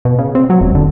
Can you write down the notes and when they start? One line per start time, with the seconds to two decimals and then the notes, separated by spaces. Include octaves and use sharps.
0.05 B2
0.19 C#3
0.35 C4
0.50 F#3
0.61 E1
0.75 D3